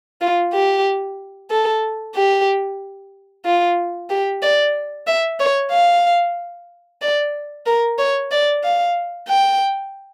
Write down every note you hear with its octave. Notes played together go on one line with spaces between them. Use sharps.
F4
G4
A4
G4
F4
G4
D5
E5
C#5
F5
D5
A#4
C#5
D5
F5
G5